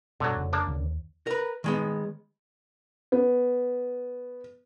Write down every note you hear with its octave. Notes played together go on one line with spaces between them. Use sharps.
G2 B2 D3 F#3
F1 C#3
A#3 D4 D5
D2 C#3
D#2
A#4 B4
D#3 G#3 B3
B3